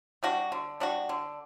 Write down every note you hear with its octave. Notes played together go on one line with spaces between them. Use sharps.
G3 D4 F#4
D3
G3 D4 F#4
D3